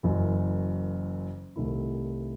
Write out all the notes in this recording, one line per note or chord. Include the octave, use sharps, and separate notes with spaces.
F#1 F#2 E3
C2 C3 D#3 A3 E4